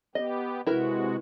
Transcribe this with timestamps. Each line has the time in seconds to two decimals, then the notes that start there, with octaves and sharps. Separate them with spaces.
0.15 B3 G4 D#5
0.67 C3 G#3 E4 F#4 A#4 B4